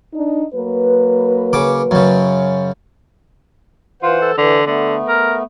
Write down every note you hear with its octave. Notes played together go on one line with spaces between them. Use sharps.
D4 D#4
F#3 A#3 B4
C#3 D6
F#2 C#3
E3 F4 C5 F#5
A4
D3 E3
D3 A3 B3
A#4